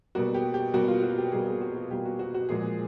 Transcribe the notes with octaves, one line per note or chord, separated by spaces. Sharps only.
B2 G3 A#3 F#4
G4
G4
B2 G3 A#3 F#4
F4
F#4
G4
B2 G3 A#3 G#4
G#4
F#4
F#4
B2 G3 A#3 G4
F#4
F#4
F#4
A#2 F3 G#3 G#4